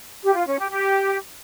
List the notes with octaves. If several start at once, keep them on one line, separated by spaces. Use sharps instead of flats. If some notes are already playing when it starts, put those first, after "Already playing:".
G4
F4
C#4
G4
G4